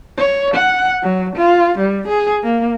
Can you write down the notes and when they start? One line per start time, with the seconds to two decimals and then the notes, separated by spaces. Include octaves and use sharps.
0.17 C#5
0.54 F#5
1.03 F#3
1.36 F4
1.79 G3
2.08 G#4
2.43 A#3